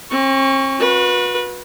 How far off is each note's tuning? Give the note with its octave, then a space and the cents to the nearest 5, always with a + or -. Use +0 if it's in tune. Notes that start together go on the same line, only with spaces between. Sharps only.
C4 +45 C#6 +5
F#4 -35 B4 -20